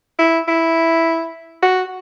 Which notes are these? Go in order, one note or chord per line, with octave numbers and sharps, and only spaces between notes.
E4
E4
F#4